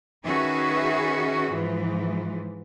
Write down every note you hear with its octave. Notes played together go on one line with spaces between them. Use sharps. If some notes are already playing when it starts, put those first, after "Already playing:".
D#3 C#4 F#4 G#4 B4 E5
G#2 E3 F3